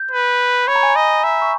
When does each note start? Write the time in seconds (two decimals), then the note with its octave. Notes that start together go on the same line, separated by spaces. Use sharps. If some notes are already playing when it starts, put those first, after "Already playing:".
Already playing: G6
0.11 B4
0.68 C#5 B5
0.75 A#5
0.83 G#5
0.90 A#5
0.95 D#5
1.24 E5 A#5
1.42 C#6